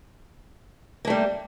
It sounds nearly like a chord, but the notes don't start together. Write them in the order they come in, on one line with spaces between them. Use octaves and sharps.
A#3 A3 G3